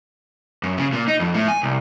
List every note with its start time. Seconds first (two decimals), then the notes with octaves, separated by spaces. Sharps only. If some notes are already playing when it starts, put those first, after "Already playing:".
0.63 F#2
0.78 C#3
0.93 A#2
1.08 D#4
1.20 F2
1.34 A2
1.48 G#5
1.63 C2